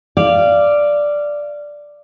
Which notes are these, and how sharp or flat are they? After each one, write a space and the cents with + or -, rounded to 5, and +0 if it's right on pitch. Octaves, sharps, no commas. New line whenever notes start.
D5 +0 F5 -20